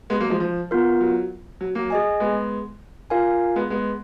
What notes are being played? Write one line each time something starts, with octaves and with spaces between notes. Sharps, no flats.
G#3 B3
F#3 A#3
F3 G#3
F3
B3 F4 A#4
F#3
F#3
F#3 A#3
G#4 D#5 G#5
G#3 B3
F4 A#4 F5 G#5
G#3 B3
G#3 B3